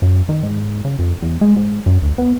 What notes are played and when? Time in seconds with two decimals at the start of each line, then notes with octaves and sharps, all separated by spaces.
0.02 F#2
0.29 D#3
0.43 G#2
0.85 C#3
0.99 F2
1.22 E2
1.41 G#3
1.56 G#2
1.86 F#2
2.02 D2
2.18 B3